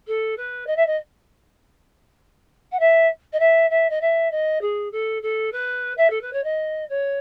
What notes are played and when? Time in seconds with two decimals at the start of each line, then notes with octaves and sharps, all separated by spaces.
0.07 A4
0.37 B4
0.67 D#5
0.76 E5
0.86 D#5
2.72 F#5
2.79 E5
3.32 D#5
3.39 E5
3.70 E5
3.89 D#5
4.01 E5
4.31 D#5
4.61 G#4
4.92 A4
5.22 A4
5.52 B4
5.97 E5
6.10 A4
6.21 B4
6.32 C#5
6.44 D#5
6.89 C#5